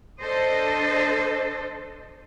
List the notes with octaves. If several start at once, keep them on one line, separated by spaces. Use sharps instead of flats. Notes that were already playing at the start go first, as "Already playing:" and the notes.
D4 A4 C5 D#5